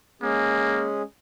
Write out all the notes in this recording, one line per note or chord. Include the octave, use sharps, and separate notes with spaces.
G#3 A#3 C#4 G#4